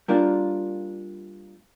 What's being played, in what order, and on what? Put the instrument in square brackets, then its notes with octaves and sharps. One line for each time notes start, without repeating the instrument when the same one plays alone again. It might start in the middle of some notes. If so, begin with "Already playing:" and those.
[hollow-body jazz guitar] G3 A#3 D4 F4 A#4